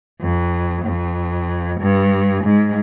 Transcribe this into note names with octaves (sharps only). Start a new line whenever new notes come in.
F2
F2
G2
G#2